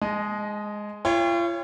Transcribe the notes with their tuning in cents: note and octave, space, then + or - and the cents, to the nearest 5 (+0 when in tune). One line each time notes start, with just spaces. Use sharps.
G#3 +0 D#5 +0 A5 -40
F4 -40 C#5 +0 G5 +35